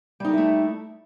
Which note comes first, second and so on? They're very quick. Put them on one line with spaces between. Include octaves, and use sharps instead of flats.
G3 D#4 A4 E4 A3